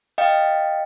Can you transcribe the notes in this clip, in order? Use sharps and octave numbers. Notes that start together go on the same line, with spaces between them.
D#5 F5 G5